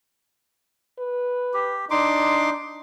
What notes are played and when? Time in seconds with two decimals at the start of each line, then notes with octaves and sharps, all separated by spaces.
0.99 B4
1.54 G4
1.91 D4 D#4 C6 D6